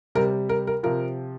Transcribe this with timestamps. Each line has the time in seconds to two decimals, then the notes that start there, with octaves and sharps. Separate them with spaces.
0.15 C3 G3 A#4
0.49 A#4
0.67 A#4
0.83 C3 F3 A#4